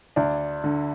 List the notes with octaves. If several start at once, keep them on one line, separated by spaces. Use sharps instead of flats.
D2 D4
D3